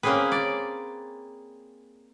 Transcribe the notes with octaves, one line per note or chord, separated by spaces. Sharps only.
A#3 C4 C#4 G#4 B4
D5